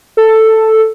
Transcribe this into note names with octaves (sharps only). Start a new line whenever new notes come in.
A4